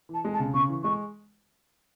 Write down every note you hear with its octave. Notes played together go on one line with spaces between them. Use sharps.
E3
A5
G#3
A5
C#3
C#3 C#6
E3
G#3 C#6